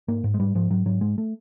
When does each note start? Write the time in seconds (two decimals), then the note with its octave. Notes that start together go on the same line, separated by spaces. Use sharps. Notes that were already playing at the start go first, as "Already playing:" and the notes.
0.08 G#2 A#3
0.24 G#2
0.34 G#3
0.40 G#2 G3
0.55 G#2 F3
0.70 G#2 F#3
0.86 G#2 F#3
1.01 G#2 G#3
1.18 A3